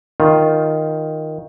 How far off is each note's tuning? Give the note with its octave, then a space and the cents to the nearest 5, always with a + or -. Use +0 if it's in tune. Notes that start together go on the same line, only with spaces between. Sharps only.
D#3 +0 F4 +0